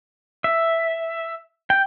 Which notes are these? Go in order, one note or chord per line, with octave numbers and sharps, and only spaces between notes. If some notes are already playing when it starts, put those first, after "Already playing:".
E5
G5